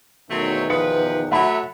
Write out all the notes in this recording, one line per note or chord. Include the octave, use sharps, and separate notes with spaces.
E2 B2 D#3 F#3 A3 C4
F3 B4 D#6 C#7
F#3 A3 E5 F#5 B5